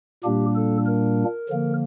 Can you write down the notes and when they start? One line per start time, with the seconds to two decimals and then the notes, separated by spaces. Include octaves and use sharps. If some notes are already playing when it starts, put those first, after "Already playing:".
0.24 A#2 G3 A#3 D4 G4
0.55 A4
0.86 A#4
1.49 D3 F3 A#3